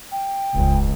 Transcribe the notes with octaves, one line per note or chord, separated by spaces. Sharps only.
G5
D#1 C#2